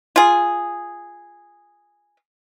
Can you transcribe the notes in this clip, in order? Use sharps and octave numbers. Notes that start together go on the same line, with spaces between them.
F4 G#4